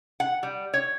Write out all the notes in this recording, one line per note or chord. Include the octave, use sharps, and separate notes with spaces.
F#5
G3
C#5